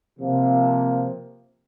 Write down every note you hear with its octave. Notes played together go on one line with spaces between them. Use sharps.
C3 F3 A#3